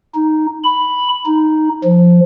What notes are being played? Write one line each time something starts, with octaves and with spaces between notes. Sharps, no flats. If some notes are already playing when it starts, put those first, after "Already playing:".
D#4
B5
D#4
F3